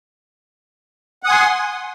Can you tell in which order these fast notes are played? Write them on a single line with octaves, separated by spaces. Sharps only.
F#5 D#6 G#5 C6